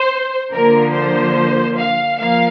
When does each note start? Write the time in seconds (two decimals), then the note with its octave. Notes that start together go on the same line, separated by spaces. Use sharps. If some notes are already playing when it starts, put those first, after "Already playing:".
Already playing: C5
0.52 D3 F3 A#3 A#4
0.93 C5
1.77 F5
2.18 F3 A#3 F5